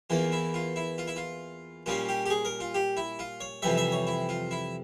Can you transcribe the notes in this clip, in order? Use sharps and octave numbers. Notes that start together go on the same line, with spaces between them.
E2 E3 A#3 F4
E4
F4
E4
F4
E4
F4
A#2 G3 C#4 F4
G4
G4
G#4
A#4
F4
G4
E4
F4
C#5
F2 C3 E3 G3 E5
E5
C#5
E4
F4
E4